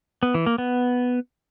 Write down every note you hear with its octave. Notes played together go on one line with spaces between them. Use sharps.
B3
E3
A#3
B3